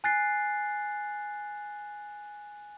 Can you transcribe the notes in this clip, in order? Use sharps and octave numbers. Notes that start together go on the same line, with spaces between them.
G#5 F#6 A6 C7